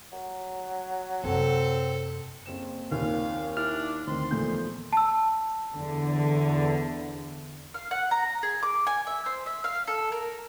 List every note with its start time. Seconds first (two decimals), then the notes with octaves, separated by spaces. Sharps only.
0.12 F#3
1.24 F#2 C3 C4 A4
2.46 F#1 C4 E7
2.91 D#2 A#2 F5
3.57 D4 E4 F6
4.07 D2 D#3 C4 C6
4.31 E2 A#2 F3 A3 G6
4.93 A5 E6
5.74 E2 D3
7.74 F5
7.91 F#5
8.11 A#5
8.43 G#4
8.63 D6
8.87 G#5
9.07 E5
9.26 C5
9.46 E5
9.64 F5
9.87 A4
10.12 A#4